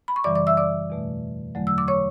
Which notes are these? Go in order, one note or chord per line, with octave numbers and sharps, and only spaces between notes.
B5
C#6
F#2 C#3 E3 G3 D5 D6
D5 D6
E5 E6
D5 D6
E2 B2 A3
E2 D3 F#3 A3
E6
D6
C#5 C#6